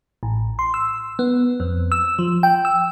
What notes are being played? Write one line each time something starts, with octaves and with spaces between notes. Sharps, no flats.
A1
C6
E6
B3
F2
E6
F3
G5
E6